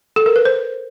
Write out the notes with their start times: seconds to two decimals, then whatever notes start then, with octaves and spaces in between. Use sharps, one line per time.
0.16 A4
0.26 A#4
0.36 B4
0.45 C5